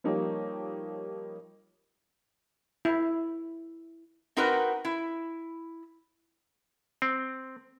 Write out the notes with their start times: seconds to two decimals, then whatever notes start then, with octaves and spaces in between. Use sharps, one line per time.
0.04 F3 G3 A#3 D#4 G4 C#5
2.85 E4
4.37 C4 D#4 F#4 A#4 B4
4.85 E4
7.02 C4